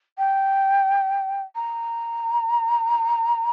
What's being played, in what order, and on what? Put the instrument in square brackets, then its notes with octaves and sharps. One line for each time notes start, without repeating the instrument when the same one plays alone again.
[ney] G5
A#5